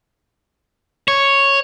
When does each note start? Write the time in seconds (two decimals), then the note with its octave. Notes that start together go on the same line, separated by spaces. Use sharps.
1.08 C#5